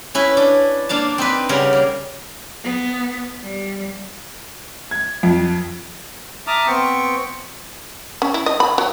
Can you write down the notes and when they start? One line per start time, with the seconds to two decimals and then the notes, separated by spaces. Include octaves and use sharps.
0.15 C#4 E4 B4
0.37 D4
0.89 A#3 D4 F5 A5
1.18 C4 D#4 B4
1.49 C#3 G3 A#4 F#5
1.73 A#3
2.64 B3
3.43 G3
4.91 G#6
5.23 F2
6.47 E5 A5 A#5 D6 D#6 F6
6.67 B3 C4 G5 C#6
8.22 C#4
8.34 E4
8.46 D#5
8.60 B5
8.78 F#3